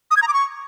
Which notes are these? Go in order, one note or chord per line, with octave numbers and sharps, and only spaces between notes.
D#6
G#6
A#5
D6
C#6